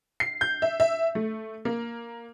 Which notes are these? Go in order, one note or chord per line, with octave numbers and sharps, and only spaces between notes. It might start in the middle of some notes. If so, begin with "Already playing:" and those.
C7
G6
E5
E5
A3
A#3